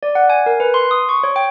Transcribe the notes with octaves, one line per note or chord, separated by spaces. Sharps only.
D5
F#5
G#5
A#4
B4
C6
D#6
C#6
C#5
G5